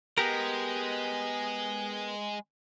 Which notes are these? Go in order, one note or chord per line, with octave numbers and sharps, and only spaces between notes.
G#3 B3 G4 A#4